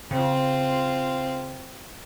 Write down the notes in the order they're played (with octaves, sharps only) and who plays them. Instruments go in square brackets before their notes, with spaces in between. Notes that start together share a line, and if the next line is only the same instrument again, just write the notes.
[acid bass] C#3 [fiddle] C4 F4